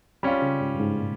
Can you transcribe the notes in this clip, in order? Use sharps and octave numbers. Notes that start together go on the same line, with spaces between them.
G3 C#4 F4
C#3
G#2
G2
G#2
A#2